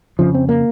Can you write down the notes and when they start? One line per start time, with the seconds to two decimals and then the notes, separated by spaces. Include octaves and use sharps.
0.19 F2 C#3 F3
0.34 C4
0.49 A#3